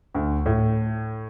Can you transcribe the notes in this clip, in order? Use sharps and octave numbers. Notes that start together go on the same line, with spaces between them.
D2
A2